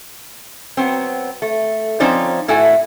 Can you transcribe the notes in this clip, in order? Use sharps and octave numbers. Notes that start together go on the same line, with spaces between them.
F#3 B3 C4
A3
F3 C4 C#4 D#4 C5 D5
A2 E4 F#4 A4 G#5